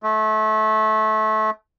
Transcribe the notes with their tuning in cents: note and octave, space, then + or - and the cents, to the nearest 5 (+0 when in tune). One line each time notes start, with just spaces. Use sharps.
A3 -25